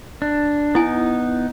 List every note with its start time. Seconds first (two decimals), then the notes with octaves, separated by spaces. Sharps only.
0.22 D4
0.75 B3 D#4 E4 G#5